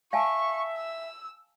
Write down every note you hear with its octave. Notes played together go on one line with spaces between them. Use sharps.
E5 F5 G#5 A5 C#6
E6